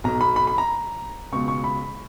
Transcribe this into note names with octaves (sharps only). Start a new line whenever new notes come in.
B1 B2 A#5
B5
B5
B5
A#5
C#2 B2 C#6
C#6
B5